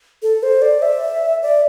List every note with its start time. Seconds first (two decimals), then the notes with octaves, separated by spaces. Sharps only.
0.23 A4
0.43 C5
0.62 D5
0.82 E5
1.43 D5